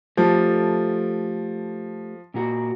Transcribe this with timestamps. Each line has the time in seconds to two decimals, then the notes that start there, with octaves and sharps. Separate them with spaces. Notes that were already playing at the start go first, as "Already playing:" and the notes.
0.17 F3 A3 G4 A4
2.34 A#2 A#3 F#4